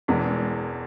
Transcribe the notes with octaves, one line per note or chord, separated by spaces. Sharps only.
E1 E2 E3 G#3